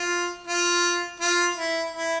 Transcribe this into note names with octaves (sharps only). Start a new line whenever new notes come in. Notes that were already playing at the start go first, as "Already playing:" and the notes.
Already playing: F4
F4
F4
E4
E4